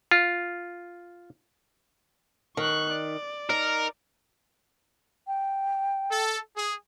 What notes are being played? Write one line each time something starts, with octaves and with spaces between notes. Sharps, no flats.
F4
D#3 C#6 F#6
D5
D#4 A#4
G5
A4
G#4